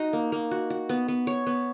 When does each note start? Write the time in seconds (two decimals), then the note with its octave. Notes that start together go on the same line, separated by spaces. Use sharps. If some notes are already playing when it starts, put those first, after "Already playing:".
Already playing: D#4 F#4
0.13 A#3
0.32 A#3
0.51 F#4
0.70 F#4
0.89 B3
1.08 B3
1.27 C#5
1.47 B3